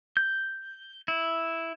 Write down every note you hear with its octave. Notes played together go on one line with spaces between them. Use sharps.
G6
E4